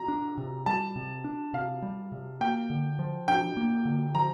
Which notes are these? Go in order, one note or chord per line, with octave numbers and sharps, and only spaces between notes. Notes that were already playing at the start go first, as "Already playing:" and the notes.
Already playing: A#5
D4
C3
G3 A5
C3
D4
C3 F5
G3
C3
A#3 G5
D3
F3
D4 G5
A#3
D3
F3 A#5